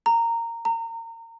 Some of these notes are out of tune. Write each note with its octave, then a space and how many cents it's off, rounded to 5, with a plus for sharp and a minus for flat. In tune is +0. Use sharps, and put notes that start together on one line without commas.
A#5 -15
A#5 -30